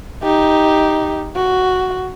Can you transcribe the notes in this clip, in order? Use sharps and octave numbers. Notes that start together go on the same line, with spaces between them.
D#4 G4
F#4